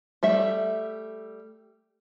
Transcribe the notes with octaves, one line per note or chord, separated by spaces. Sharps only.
G3 A3 E5